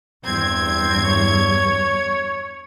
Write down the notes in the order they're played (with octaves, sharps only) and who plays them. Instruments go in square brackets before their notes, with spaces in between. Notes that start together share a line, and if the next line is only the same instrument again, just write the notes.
[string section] E2 G2 G#6 [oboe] C4
[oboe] C#5